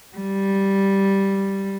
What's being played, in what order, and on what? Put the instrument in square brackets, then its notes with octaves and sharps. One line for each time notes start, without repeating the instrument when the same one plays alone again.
[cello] G3